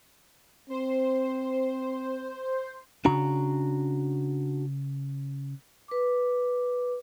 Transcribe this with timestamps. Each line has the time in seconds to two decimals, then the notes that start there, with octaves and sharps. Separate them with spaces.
0.70 C4 C5
3.05 C#3 C#4 D4 F#4 A#5
5.88 B4 D6